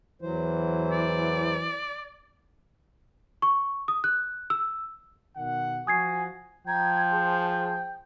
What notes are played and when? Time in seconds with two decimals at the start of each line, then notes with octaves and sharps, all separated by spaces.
0.22 E2 E3 F#3 C5
0.92 D5
3.42 C#6
3.88 D#6
4.04 F#6
4.50 E6
5.37 B2 D#3 F#5
5.87 F3 F#4 G#5 D#6 G#6 C7
6.67 F3 G5 A#5 G#6
7.11 G#4 C5 A5